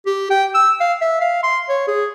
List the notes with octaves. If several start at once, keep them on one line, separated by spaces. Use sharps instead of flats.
G4
G5
E6
F5
E5
F5
C6
C#5
G#4